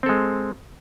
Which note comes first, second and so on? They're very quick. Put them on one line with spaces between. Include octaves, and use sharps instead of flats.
C4 A4 G#3